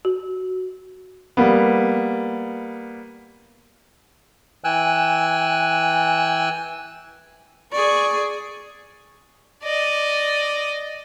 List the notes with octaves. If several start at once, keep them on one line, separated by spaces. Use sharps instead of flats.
F#4
G3 A#3 B3
E3 G5 G#5 E6 F#6
G#4 D5 C#6
D5 D#5